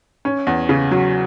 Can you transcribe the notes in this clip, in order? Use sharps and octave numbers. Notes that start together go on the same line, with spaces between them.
C#4
E2
C#3
F#3